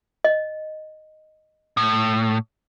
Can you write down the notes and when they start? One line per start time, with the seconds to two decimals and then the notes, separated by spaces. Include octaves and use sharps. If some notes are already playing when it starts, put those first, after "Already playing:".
0.24 D#5
1.77 A2